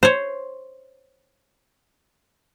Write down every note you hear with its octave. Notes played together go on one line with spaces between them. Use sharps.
C5 C#5